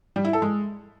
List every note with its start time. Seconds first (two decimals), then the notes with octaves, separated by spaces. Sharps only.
0.16 G3
0.25 E4
0.33 A4
0.42 G#3